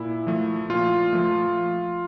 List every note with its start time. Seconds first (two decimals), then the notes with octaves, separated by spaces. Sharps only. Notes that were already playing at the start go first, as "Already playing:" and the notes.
Already playing: A#2 E4
0.27 F3 A3
0.70 A#2 F4
1.13 F3 A3